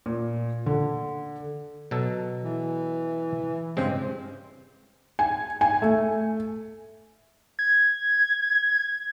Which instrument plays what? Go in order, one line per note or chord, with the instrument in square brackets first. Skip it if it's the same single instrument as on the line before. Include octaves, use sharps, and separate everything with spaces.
[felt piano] A#2
D3
[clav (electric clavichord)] B2 F#3 A4
[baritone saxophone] E3
[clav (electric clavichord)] G2 C#3 G#3 [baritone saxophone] C4
[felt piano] G#5
G#5
A3
[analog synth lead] G#6